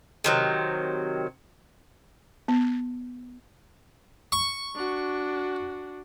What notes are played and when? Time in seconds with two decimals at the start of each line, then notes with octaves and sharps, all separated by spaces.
0.24 C3 D#3 F#3
2.48 B3
4.32 C#6
4.75 D4 F#4